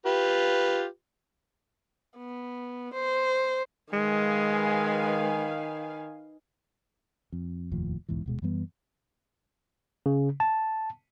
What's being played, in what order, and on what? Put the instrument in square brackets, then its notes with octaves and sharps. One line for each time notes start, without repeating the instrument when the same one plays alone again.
[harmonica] F4 G4 B4
[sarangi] B3
C5
[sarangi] D#3 [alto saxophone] G#3 [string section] B4 F5 G#5
[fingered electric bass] F2
F1 D#2 A2 F3
B1 E2 G#2 E3
D1 B2 G#3
F#2 E3 G3 B3
[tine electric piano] C#3
A5